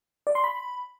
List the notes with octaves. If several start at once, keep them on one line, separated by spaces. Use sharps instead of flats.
D5
C6
B5